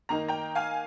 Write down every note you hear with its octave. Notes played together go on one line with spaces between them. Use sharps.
D#3 A#3 D#4 A#5
G5 A#5
F5 G#5